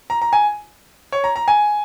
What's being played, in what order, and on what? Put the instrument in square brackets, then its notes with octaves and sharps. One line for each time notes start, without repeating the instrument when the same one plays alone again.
[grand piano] A#5
A#5
G#5
C#5
A#5
A#5
G#5